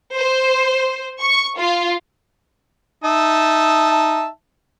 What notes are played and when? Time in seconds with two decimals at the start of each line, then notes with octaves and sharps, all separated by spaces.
0.14 C5
1.19 C#6
1.56 F4
3.04 D#4 E5 A5